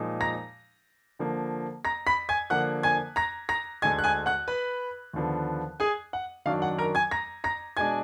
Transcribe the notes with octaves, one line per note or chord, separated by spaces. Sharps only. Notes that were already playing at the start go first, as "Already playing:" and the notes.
Already playing: A#2 F3 G#3 D#4
A#5 A#6
D3 F3 A#3
A#5 A#6
B5 B6
G#5 G#6
D3 F3 A#3 D4 F#5 F#6
G#5 G#6
A#5 A#6
A#5 A#6
D2 D3 G#3 G#5 G#6
F#6
G#5 G#6
F#5 F#6
B4 B5
D#2 D3 F3 B3
G#4 G#5
F#5
F#2 D#3 F#3 D4 F5
F#5
A#4 A#5
G#5 G#6
A#5 A#6
A#5 A#6
B2 G#3 D4 G#5 G#6